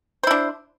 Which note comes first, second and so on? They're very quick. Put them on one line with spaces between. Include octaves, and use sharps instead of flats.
C5 E4 D4